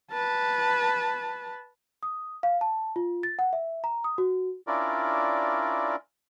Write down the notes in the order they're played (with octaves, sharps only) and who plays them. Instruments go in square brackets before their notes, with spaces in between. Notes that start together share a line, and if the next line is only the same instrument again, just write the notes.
[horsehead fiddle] B4 A5
[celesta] D#6
F5
A5
F4
A6
F#5
E5
A#5
D#6
F#4
[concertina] C#4 D4 E4 F4 A#4 D5